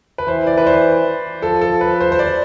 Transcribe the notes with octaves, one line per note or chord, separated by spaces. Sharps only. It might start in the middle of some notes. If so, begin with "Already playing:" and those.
B4
E3 C5
D5
B4
C5
F3 A4
A4
B4
C5
C5
D5